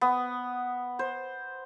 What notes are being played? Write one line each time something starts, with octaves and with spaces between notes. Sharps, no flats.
B3
C5